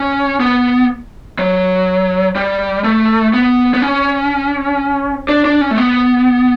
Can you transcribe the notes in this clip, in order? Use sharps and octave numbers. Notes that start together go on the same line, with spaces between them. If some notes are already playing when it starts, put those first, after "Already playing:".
Already playing: C#4
B3
F#3
G3
A3
B3
B3
C#4
D4
D4
C#4
A3
B3